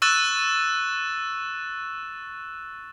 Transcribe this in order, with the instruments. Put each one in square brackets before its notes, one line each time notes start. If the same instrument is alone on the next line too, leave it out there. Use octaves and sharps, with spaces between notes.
[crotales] C#6 E6 F#6 A6 E7